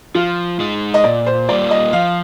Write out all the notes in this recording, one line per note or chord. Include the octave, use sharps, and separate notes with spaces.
F3 F4
G#3 D#4
D#5
A#2 D5
C5
G3 A#3 F4 D5
D#5
F3 F5